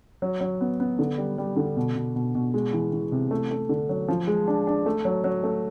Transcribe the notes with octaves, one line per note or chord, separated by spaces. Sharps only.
F#3
F#3
B3
B3
D3
G3
G3
D3
B2
B2
B2
B2
G#3
E3
E3
C3
A3
A3
D3
F#3
F3
G#3
D4
D4
A3
F#3
F#3
A3